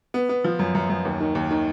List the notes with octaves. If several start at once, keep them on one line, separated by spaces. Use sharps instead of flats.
B3
B3
F3
F#2
F#2
F#2
D#2
D#3
D#2
D#3